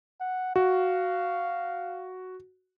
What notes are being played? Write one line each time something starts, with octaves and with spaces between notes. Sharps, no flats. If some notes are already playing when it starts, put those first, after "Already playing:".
F#5
F#4 F5